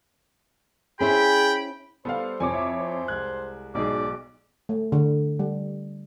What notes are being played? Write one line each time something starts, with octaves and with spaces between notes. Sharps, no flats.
C#4 E4 G#4 C5 G5 B5
G3 B3 A4 C5 F5
F2 C3 C#5 G#5 D6
E4 E5
C5
C2 G#3 F#6 G#6
B1 G#2 G#4 D5
A3
D3
G3